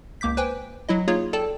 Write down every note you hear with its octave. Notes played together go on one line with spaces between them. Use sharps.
C#2 A#3 D6 G6 B6
B4 C5 G5 G#5
F#3 E4 D#5
A#3 D#4 F4 G#4 C#5
A4 D5 G5 A5